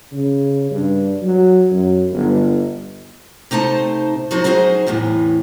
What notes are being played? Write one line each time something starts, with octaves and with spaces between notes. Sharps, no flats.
C#3
G2
F#3
F#2
G1
C3 A3 D#4 C5 A5
F3 F#3 D#4 F#4 C5
F#3 D#4 E4 G#4 C5 D#5
E2 A2 C3 E3